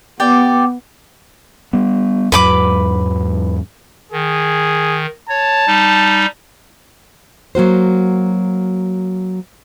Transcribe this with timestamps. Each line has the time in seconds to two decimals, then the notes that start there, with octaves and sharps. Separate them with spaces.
0.20 B3 G4 D5 G5
1.73 G3 B3
2.32 E2 G#2 F#3 B4 B5 D6
4.12 D#3 G#4
5.29 C#5 A5
5.67 G3 D#4
7.55 F#3 A#3 F#4 C5